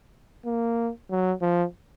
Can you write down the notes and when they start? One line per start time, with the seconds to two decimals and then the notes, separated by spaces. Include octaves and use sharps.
0.45 A#3
1.10 F#3
1.42 F3